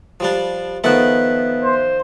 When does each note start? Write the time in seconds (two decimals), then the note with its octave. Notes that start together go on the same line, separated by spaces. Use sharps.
0.20 F3 G3 D4
0.84 D#3 F3 B3 A4 E5 F#6
1.64 C5